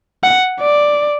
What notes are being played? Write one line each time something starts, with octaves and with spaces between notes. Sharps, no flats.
F#5
D5